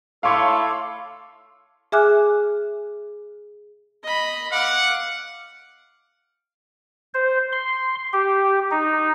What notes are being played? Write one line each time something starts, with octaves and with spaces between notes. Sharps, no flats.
A3 E4 A4 C#5 F5 C6 D6
G#4 E5 G#5 D6 F6 F#6
D#5 B5
F5 F#5 D6
C5
C6
G4
D#4